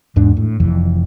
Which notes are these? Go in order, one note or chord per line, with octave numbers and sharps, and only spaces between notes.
E2 G#2 D4
A2
F1 F2 E3